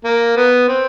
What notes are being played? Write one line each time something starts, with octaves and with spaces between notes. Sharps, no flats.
A#3
B3
C4